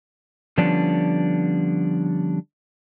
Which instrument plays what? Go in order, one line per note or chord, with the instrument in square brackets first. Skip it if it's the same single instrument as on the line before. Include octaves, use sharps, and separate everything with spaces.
[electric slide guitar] D3 F3 G3 B3 C#4 D4